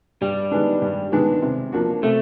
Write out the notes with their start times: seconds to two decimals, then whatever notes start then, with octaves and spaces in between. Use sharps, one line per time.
0.21 G2 G3
0.51 D#3 G#3 B3 D4
0.82 G2
1.12 D#3 G#3 B3 D4
1.42 C3
1.72 F3 A#3 D4 F#4
2.03 C3 A3